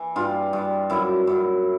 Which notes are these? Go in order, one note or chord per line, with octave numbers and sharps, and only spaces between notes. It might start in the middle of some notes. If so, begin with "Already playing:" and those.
Already playing: E3
G2 F4
G2
F#2 E4
F#2